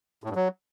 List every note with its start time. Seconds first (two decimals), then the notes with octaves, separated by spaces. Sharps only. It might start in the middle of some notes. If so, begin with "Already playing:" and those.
0.24 A2
0.30 G2
0.35 F#3